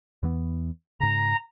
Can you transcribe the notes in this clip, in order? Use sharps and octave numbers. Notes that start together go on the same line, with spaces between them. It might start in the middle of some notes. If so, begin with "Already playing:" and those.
E2 E3 B3
G#2 C#3 A#5